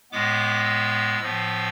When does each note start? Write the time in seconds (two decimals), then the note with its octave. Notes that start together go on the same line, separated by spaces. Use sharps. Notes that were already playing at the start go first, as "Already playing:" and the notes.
0.12 A2 G#3 B3 D6
0.66 E6
1.20 A2 F3 B3